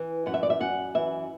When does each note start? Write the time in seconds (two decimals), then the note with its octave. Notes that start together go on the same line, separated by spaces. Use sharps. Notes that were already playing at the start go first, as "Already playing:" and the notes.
Already playing: E3
0.26 F#2 F#5
0.34 E5
0.43 D5
0.50 E5
0.60 F#2 F#5
0.94 E3 E5